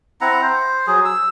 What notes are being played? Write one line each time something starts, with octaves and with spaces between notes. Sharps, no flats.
C4 E4 F#5 A#5
C5
F#3 G#4
E6